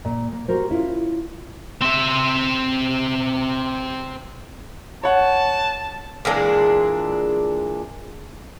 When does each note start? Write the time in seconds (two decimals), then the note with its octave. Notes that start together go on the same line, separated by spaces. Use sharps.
0.05 A#2
0.32 A#3
0.48 F#4 G4 A#4 C5
0.69 C#4 E4 F4
1.81 C4 E5
5.03 C#5 F#5 A5
6.25 A#2 E3 G#3 D4